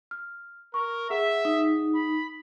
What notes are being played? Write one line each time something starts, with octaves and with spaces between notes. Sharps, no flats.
F6
A#4 C#6
G#4 E5 F#5
D#4
B5